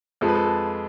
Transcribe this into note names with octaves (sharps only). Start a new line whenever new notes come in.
F2 F3 G#3 A4
B4
A4
A4